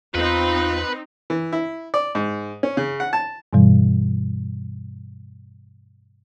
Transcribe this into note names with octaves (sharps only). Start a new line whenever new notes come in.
E2 C4 D#4 F4 B4
E3
E4
D5
G#2
C#4
C#3
F#5
A5
G2 B2 E3 G3